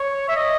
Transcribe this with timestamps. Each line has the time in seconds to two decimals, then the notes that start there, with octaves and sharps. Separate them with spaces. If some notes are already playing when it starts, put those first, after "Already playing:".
Already playing: C#5
0.29 E5
0.36 D#5